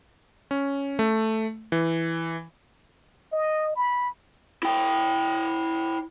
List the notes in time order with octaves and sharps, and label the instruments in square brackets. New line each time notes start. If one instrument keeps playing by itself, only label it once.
[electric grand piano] C#4
A3
E3
[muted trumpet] D#5
B5
[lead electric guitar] E4 G5